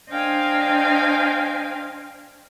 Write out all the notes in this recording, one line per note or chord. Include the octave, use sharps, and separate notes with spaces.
D4 C5 D#5 F5 G5 G#5